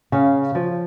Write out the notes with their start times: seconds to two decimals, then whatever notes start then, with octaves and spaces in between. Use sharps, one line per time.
0.12 C#3 C#5 F5
0.55 F3